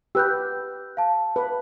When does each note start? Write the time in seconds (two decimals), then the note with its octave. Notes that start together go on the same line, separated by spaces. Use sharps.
0.15 G4 B4 E6 F#6 G6
0.97 F5 A5
1.36 B4